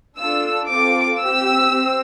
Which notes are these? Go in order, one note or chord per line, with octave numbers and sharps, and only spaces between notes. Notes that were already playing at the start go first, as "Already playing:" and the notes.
D4 F4 A4 E6
C4 F4 A4 D6
C4 G4 E6
C4